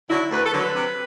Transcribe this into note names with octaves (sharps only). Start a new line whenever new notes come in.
D3 F#3 E4
D2 B4
A4
D3 F#3
B4
C3